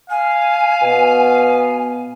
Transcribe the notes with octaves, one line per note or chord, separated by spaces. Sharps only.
F5 G#5
B2 B3